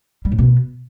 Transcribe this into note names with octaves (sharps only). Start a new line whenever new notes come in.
G3
A2
B2